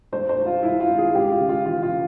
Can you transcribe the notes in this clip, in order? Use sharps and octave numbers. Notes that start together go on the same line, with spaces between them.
G2 C5
C5
G3
F4
G2 E4
F4
G#1
G#4
C#2 G4
F4
C#3
F4
E3 F4
F4
C#3